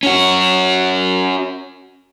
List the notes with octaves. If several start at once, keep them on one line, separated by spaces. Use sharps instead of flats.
C#4 F#4